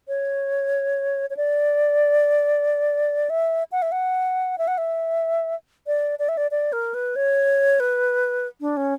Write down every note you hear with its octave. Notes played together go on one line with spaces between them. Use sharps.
C#5
C#5
D5
E5
F#5
E5
F#5
E5
F#5
E5
D5
D5
E5
D5
D5
A#4
B4
C#5
B4
D4
C#4